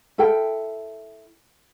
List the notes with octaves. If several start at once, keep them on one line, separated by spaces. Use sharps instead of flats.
E4 A4 A#4 G5